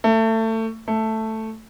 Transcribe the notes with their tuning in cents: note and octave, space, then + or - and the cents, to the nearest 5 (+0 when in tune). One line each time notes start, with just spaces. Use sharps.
A3 +25
A3 +5